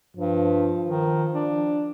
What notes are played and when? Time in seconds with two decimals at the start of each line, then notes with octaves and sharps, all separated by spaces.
0.17 G2 F3
0.86 D#3
1.35 D4